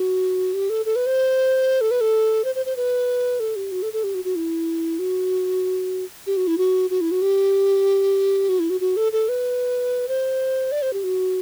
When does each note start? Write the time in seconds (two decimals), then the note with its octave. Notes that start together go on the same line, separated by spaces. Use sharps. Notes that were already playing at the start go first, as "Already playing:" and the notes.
Already playing: F#4
0.54 G4
0.70 A4
0.85 A4
0.96 B4
1.06 C5
1.81 A4
1.91 B4
2.01 A4
2.44 C5
2.55 C5
2.66 C5
2.76 B4
3.40 A4
3.56 G4
3.71 F#4
3.82 A4
3.93 A4
4.04 G4
4.14 F#4
4.24 F#4
4.36 E4
4.99 F#4
6.27 G4
6.37 F#4
6.47 E4
6.58 F#4
6.90 F#4
7.01 E4
7.11 F#4
7.22 G4
8.49 F#4
8.59 E4
8.70 F#4
8.80 F#4
8.96 A4
9.12 A4
9.29 B4
10.08 C5
10.72 D5
10.82 C5
10.93 G4
11.03 F#4